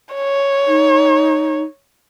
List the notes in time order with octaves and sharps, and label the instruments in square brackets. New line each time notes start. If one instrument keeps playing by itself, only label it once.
[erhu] C#5
[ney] D#4